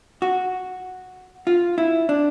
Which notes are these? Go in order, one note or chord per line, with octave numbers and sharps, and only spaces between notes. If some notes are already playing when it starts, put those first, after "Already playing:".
F#4
F4
E4
D4